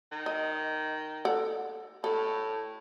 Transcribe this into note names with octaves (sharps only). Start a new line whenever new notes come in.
D#3
D#5
A4 D5 F#5
A2 A4